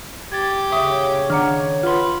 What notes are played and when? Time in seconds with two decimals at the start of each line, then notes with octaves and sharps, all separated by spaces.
0.32 G4 G#6 A6
0.72 C#3 C#5 E5 C#6 D#6
1.30 D#3 D4 F#5 A#5 F6
1.83 F4 B4 F#5 C6